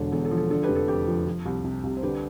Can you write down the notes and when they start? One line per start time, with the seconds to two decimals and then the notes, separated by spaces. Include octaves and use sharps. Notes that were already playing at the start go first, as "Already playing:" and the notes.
Already playing: E1 D3 A4
0.12 E2 A4
0.25 A4
0.31 F3
0.37 A4
0.50 D3 A4
0.63 G4 B4
0.69 F1
0.75 A4
0.88 F2 G4
1.07 F3
1.27 F3
1.45 C2
1.65 C3
1.84 C2
1.97 C5
2.03 D3 G4 B4